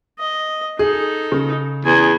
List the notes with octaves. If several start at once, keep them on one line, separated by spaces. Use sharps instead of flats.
D#5
D#4 G#4 A4
C#3
E2 G#4 G#5